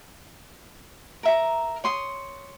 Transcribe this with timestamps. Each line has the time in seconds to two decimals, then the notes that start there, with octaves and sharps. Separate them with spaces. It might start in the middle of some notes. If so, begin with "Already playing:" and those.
1.23 A#4 E5 A#5
1.84 C#5 C6 D#6